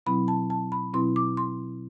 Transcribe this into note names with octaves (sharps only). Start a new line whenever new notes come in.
B2 F#3 C4 E4 B5
A5
A5
B5
B2 F#3 C4 E4 C6
D6
C6